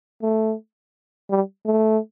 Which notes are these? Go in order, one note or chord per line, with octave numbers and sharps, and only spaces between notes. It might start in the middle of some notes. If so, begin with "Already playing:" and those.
A3
G3
A3